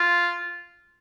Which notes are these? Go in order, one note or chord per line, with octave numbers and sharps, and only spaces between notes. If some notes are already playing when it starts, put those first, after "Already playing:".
Already playing: F4